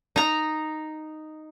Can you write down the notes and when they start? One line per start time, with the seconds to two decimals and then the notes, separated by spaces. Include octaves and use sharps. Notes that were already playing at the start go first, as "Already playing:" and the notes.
0.16 D#4 A#5